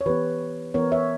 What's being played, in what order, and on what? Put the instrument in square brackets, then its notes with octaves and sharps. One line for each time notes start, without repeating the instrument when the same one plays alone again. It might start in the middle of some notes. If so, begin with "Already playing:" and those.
[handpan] C#5
E3 B3 G4 B4
E3 B3 A#4 C#5
C#5 E5